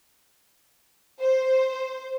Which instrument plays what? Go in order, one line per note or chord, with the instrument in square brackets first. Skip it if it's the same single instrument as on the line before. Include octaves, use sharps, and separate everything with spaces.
[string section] C5